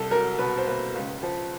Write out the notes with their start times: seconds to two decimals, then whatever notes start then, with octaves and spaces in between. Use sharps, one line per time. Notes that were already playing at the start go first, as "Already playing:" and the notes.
Already playing: C2 A4
0.11 F#3 A#4
0.38 B2 B4
0.57 C5
0.67 A#3 B4
0.95 C#2
1.23 F3